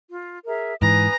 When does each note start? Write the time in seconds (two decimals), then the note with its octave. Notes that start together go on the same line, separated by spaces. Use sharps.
0.11 F4
0.45 G#4 A#4 E5
0.82 G#2 E3 B4 G#5 A#5 D#6